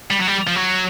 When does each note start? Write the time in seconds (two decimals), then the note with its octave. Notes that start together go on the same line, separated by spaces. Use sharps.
0.10 G3
0.19 F#3
0.27 G3
0.47 F3
0.56 F#3